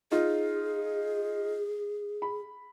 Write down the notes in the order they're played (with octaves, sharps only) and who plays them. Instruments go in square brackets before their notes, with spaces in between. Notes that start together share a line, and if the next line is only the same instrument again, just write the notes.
[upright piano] D#4 F4 [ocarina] G#4
[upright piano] B5